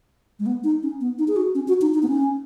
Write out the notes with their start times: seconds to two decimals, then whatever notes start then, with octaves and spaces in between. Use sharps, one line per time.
0.39 G#3
0.46 B3
0.64 D#4
0.83 C#4
1.01 B3
1.19 D#4
1.28 G#4
1.36 F#4
1.55 C#4
1.68 F#4
1.81 D#4
1.94 D#4
2.03 B3
2.08 C#4